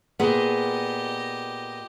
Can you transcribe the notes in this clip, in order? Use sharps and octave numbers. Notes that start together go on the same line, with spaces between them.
A#2 B3 G4 G#4 D#5